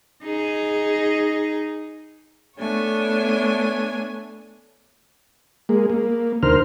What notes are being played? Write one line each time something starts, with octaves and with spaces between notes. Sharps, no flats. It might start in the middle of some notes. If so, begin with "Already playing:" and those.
D#4 G#4
A3 B3 D4 C#5 G#5
G#3 A#3
A#3
D2 D#3 A#4 C5 F6